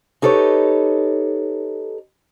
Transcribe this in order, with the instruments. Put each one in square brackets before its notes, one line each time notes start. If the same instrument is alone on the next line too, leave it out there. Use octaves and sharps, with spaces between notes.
[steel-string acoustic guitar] D#4 G4 A4 B4 C#5